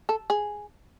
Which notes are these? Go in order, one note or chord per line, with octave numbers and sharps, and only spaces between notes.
A4
G#4